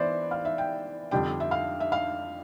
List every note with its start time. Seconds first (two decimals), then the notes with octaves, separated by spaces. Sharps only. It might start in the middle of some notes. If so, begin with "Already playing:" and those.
Already playing: E3 B3 C5 D5 E5
0.31 F5
0.45 E5
0.58 G5
1.11 F2 D3 G3 D4 G5
1.40 E5
1.51 F5
1.80 E5
1.92 F5